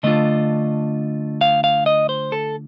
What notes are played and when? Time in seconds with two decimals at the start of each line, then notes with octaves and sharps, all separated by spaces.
0.03 D3 A3 D4 F4 D#5
1.41 F5
1.64 F5
1.86 D#5
2.09 C5
2.32 A4